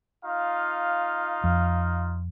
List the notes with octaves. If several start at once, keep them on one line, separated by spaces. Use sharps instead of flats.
D#4 F4 F5
F2